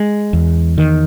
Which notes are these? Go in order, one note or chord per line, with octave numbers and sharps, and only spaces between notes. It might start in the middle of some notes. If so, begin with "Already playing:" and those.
Already playing: G#3
E2
D#3